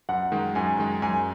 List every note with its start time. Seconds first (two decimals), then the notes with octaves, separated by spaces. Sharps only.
0.09 F#2 F#5
0.32 D#3 G#3
0.55 F#2 G#5
0.78 D#3 G#3
1.02 F#2 G#5